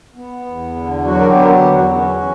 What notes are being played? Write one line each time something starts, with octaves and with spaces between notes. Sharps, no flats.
B3
E2
D3
F#3 F#4
A#4
G4
B3
A#4
G4
E2
F#4
C#4 F#4